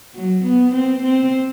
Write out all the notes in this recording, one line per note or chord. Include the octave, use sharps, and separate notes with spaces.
F#3
B3
C4
C4